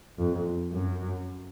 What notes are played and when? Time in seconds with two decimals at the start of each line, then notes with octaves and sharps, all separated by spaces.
0.19 F2
0.73 F#2